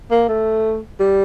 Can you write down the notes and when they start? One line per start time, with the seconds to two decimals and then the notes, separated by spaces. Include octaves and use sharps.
0.11 A#3
0.29 A3
1.00 G3